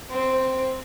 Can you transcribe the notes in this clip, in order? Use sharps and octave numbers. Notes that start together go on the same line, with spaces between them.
C4